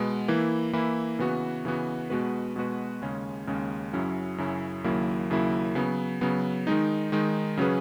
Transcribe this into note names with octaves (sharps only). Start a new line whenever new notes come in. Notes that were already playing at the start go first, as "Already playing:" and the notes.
Already playing: B2 G#3 B3
E3 A#3 E4
E3 A#3 E4
C#3 E3 B3 F#4
C#3 E3 B3 F#4
B2 G#3 B3 F#4 B4
B2 G#3 B3 F#4 B4
D#2 C#3 G#3 C#4
D#2 C#3 G#3 C#4
F#2 C#3 F#3 C#4 E4
F#2 C#3 F#3 C#4 E4
D#2 C#3 F#3 A#3 E4
D#2 C#3 F#3 A#3 E4
C#3 F#3 B3
C#3 F#3 B3
D#3 G#3 D#4
D#3 G#3 D#4
C#3 F#3 C#4 G#4 B4